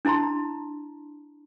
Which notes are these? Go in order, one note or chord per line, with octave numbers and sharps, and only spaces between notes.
D4 E4 A5 A#5 C6